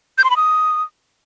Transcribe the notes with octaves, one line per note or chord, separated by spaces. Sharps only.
G6
C6
B5
D#6